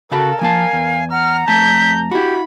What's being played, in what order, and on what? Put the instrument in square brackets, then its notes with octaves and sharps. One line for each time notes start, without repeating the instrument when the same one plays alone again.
[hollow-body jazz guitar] C#3 F5 B5 [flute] F#4 [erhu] A4 [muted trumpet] A#4
[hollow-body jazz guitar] F3 A#3 A5 [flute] F5 [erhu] G#5
[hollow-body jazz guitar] E2
[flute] F#5 [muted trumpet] A#5 [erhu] F6
[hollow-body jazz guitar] F2 A3 A5 [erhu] G6 [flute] B6
[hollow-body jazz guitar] E4 F#4 [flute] G4 [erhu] B5